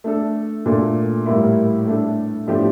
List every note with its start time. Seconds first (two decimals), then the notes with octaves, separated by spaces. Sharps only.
0.04 A3 D4 A4
0.66 A#2 A3 D4 A4
1.26 A2 G3 A#3 E4
1.87 A3 D4 A4
2.47 A2 F3 A3 D4 G4